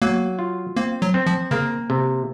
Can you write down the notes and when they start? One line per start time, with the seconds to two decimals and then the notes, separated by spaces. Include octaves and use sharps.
0.02 F#3 A#3
0.39 F4
0.76 A#3 C4
1.02 F#3
1.14 C4
1.26 F3
1.51 C#3 A#3
1.90 C3